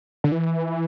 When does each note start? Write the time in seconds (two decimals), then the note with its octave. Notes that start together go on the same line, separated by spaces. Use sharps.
0.24 D3
0.32 E3